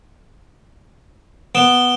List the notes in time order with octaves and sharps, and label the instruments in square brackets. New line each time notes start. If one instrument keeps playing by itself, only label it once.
[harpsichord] B3 [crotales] D7 E7 G7